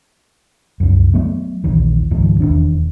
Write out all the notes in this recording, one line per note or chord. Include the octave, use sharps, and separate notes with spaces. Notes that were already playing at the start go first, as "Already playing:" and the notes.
C2 F#2
F#3 A3 B3
A#1 D#2 E3
C#2 G#2 D#3 F3
E1 D#2 D4